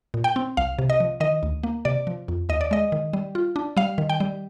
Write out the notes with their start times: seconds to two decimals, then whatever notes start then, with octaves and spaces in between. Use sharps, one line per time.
0.14 A#2
0.24 G5
0.36 C4
0.57 C2 F5
0.79 C3
0.90 D#5
1.00 F3
1.20 D#3 D#5
1.43 D2
1.63 A#3
1.85 C3 D5
2.07 F3
2.28 F2
2.49 D#2 D#5
2.61 D5
2.71 G#3 D#5
2.92 D#3
3.13 G3
3.35 F4
3.56 D4
3.77 G3 F5
3.98 D#3
4.10 G5
4.20 G3